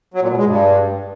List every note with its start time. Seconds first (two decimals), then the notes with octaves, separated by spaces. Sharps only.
0.14 F#3
0.22 A#2
0.30 B2
0.38 G#3
0.46 G2